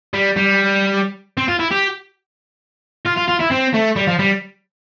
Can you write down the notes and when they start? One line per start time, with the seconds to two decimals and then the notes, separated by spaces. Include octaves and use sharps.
0.14 G3
0.37 G3
1.37 C4
1.48 F4
1.60 E4
1.71 G4
3.06 F4
3.18 F4
3.29 F4
3.41 E4
3.52 C4
3.74 A3
3.96 G3
4.07 F3
4.19 G3